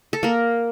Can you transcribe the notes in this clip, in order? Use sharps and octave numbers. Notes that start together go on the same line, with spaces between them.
A4
A#3 A#4